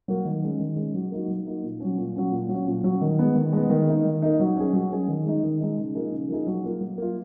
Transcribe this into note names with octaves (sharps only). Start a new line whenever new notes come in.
F#3 A#3
D#3
G#3 C#4
D#3
G#3 C#4
F#3
A#3 D#4 F#4
F#3
A#3 D#4 F#4
A#2
F#3 C#4
A#2
F#3 C#4
A#2
F#3 C#4
A#2
F#3 C#4
D#3
G#3 B3
D#3
G#3 B3
D#3
A#3 D#4
D#3
A#3 D#4
F#3
C#4 G#4
F#3
C#4 G#4
D#3
G#3 D#4
D#3
G#3 D#4
C#3
F3 A#3 D#4 G#4
C#3
F3 A#3 D#4 G#4
F#3
A#3 F4
F#3
A#3 F4